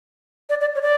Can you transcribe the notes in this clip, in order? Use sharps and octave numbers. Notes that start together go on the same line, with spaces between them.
D5
D5
C#5
D5